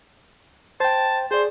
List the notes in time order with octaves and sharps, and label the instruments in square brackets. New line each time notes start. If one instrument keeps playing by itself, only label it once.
[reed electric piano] C5 G5 [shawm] A5
[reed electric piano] G#4 D5 [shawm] C5